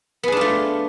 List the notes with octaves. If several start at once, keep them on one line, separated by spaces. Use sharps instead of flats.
A3 B3 D4 F4 G#4